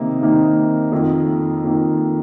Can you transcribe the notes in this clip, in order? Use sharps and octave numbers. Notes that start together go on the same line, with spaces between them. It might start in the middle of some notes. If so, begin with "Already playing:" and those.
Already playing: C3 D#3 A#3 D#4
C3 D#3 A#3 D#4
F2 D#3 A#3
F2 D#3 A#3